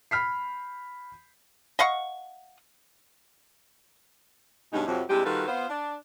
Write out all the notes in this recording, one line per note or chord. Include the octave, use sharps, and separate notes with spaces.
B5 F6 B6 C7
D#5 F5 F#5 C#6
G2 B2 G#3 C#4 D#4
F2 C3 F#3
C3 G#3 D4 E4 G4
D#3 G3 F4 F#4 A4 B4
B3 F4 C5
D4